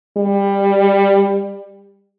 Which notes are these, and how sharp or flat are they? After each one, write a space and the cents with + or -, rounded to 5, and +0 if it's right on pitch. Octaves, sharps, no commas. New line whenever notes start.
G3 +20